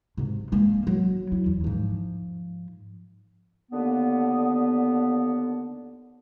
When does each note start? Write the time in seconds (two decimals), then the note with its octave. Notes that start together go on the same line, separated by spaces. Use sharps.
0.18 G#2 C3
0.52 G#3 A#3
0.87 F#3
1.32 E4
1.46 E2
1.64 G#2 F3
3.72 D#2 D3 A#3 B3